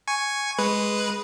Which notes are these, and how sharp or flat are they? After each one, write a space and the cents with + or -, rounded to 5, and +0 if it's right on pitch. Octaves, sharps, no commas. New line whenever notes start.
G#5 +0 C#6 +0
G#3 +0 B4 +0